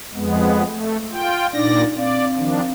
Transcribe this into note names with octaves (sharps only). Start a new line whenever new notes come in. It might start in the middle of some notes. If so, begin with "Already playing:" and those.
F2 G#3 B3
A3
F4 G5
A#2 D4 D#4 D5 A#6
C4 D5 F5
D#3 F3 D4